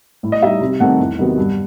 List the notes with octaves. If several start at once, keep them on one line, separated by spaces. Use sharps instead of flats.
A2
D#5
G3 D#4 E5
C3
D#3 A3 C4 D#4 F#5
E2
C3 D#3 F#3 B3
G2